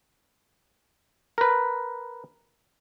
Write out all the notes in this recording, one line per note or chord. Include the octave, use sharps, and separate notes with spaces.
A#4 B4